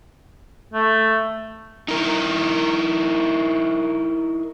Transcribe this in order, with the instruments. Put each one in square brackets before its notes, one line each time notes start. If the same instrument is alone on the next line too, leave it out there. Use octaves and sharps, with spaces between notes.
[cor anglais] A3
[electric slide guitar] D#4 E4 A#4